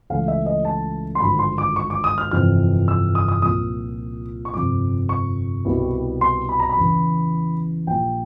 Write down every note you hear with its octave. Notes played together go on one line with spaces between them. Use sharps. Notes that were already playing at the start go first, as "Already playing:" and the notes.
C#2 C#3 E3 A3 C#4 F5
E5
D#5
A5
C6
G#1 G2 D3 F3 B5
C6
D6
C#6
D6
D#6
F6
G1 F2 C3 E3 F6
E6
D#6
D#6
C2 A#2 F3 D#6
C#6
G1 F2 C3 D6
C#6
C2 B2 G3 B3 E4
C6
B5
A#5
B5
E2 C#3 E3
A#1 A#2 G3 G5